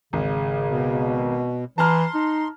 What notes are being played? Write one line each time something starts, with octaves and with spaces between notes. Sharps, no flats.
G#1 C#3
B2
E3 A5 A#5 C6 F6
D#4